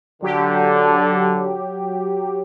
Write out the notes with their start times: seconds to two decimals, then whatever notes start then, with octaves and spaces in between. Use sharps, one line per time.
0.23 D3 F#3 G4